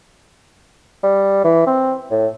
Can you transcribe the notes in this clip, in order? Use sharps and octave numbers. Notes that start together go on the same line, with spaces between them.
G3
E3
C4
A2